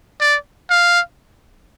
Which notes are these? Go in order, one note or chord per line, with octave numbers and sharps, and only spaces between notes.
D5
F5